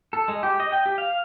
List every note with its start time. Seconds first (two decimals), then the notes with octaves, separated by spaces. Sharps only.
0.13 A4
0.28 G#3
0.43 G4
0.60 D#5
0.72 G5
0.86 G4
0.98 F5